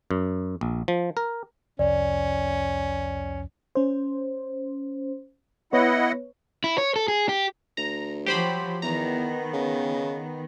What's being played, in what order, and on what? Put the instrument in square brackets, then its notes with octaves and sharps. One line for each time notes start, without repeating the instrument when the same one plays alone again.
[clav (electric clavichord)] F#2
A#1
F3
A#4
[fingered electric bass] C2 F2 [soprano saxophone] C#4 [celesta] D5
[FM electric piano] C#4 C5
[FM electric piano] B3 B4 C#5 [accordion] E4 D#5 F#5
[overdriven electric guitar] E4
C#5
A4
G#4
G4
[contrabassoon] D2 [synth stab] A#5
[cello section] F3 F#3 [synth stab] G4 C5 B5
[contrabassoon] E2 [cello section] D#3 B3 [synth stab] A#5
[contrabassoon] C#3